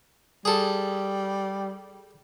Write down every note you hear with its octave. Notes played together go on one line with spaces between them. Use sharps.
G3 G#4 A4